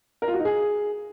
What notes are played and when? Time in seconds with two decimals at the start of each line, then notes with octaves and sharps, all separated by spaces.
0.22 A#4
0.28 F4
0.34 F#4
0.39 D#4
0.45 G#4